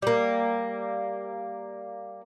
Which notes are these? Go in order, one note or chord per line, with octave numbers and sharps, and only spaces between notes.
G3 A#3